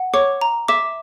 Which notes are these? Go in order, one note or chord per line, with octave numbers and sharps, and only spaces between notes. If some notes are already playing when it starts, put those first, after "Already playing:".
Already playing: F#5
C#5 D6
A#5
E5 D6